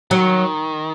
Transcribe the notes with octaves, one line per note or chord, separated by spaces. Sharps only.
D#3 F#3